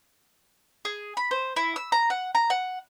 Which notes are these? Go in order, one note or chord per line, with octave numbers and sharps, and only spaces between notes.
G#4
B5
C5
E4
E6
A#5
F#5
A#5
F#5